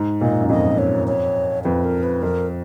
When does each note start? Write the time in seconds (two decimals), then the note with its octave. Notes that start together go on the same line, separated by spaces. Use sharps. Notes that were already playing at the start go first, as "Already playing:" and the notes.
Already playing: G#2
0.21 A#2 D#5
0.31 G#2
0.40 F#2
0.49 F2 D#5
0.78 C#5
1.08 C#5
1.64 F2 B4
1.84 A#4
2.03 B4
2.22 F2 A#4